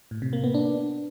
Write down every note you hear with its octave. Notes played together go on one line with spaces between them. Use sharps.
A2
C3
A#3
B3
D4